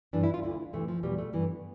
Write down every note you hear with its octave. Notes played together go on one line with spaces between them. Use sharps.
G2 E3 D4
E4
F4
D2 D3 E4
D2 C3 E3 A3
F3
E2 B2 G3
A3
G2 E3 B3